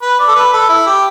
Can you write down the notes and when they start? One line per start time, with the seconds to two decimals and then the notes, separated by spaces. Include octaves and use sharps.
0.02 B4
0.19 D5
0.28 A4
0.35 B4
0.53 A4
0.69 E4
0.87 G4